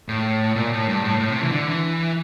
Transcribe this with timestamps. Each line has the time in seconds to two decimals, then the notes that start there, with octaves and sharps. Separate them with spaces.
0.08 A2
0.56 A#2
0.73 A2
0.89 G2
1.04 A2
1.20 A2
1.31 C3
1.42 E3
1.52 D3
1.69 E3